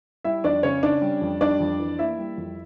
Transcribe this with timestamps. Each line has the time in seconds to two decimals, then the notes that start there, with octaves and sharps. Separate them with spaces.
0.25 G3 E4 E5
0.44 F2 D4 D5
0.63 C#3 C#4 C#5
0.83 C#4 D4 D5
1.02 G3
1.22 F2
1.41 G3 D4 D5
1.60 F2
1.80 E3
1.99 A#3 E4 E5
2.19 G3
2.38 F2